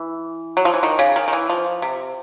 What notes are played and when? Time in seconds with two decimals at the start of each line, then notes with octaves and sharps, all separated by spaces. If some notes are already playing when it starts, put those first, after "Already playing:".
Already playing: E3
0.57 F#3
0.65 F3
0.74 E3
0.83 D#3
0.99 C#3
1.16 D#3
1.28 D#3
1.33 E3
1.50 F3
1.82 C3